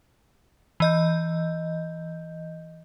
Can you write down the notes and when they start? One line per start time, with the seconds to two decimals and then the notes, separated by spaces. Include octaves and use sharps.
0.80 E3 D#5 G6